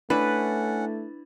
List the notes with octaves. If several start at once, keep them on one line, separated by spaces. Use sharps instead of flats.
A3 C#4 D4 E4 B4 F#5 A6